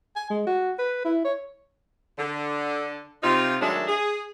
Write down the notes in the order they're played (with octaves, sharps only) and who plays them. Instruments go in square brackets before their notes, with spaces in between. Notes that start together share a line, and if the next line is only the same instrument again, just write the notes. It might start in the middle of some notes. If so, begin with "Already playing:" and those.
[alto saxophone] G#5
G#3
F#4
B4
E4
C#5
[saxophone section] D3
C3 D#4 F4
D#3 F#3 G#3 A3 D4 A4
G#4